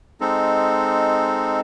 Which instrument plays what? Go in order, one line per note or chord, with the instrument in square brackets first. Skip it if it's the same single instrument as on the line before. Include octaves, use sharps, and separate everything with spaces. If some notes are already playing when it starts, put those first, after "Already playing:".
[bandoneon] G#3 C4 D#4 A4